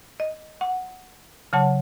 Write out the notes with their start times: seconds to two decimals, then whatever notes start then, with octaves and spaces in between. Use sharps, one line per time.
0.20 D#5
0.61 F#5
1.53 C#3 F#3 C#5 F#5 A5